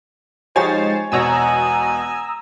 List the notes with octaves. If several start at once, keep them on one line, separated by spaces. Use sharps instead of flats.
F3 G#3 D#4 G4 C5 C#5 G#5 A6
E1 B2 C#5 G#5 A#5 D#6 E6